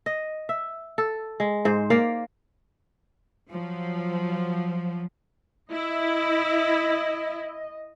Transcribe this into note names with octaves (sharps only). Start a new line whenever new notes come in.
D#5
E5
A4
G#3
G#2 C5
A#3 D5 F5
F3 F#3
E4 D#5